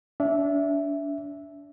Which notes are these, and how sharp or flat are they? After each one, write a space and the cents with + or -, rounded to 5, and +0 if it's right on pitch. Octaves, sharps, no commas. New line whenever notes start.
D4 -30 E5 +0